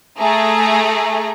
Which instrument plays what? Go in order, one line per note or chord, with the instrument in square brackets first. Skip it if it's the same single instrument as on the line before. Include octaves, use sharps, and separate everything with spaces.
[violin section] A3 G#4 A#5